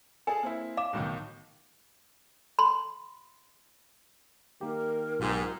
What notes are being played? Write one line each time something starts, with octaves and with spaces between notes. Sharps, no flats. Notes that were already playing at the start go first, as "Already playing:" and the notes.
G#4 A4 G#5
A#3 C4 E4
F5 D6 E7
B1 A2 D#3
B5 C6
D#3 A#3 G4 A#4
B1 G#2 F4 G4